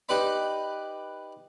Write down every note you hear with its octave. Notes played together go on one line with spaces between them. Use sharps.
D#4 G4 B4 D5 B5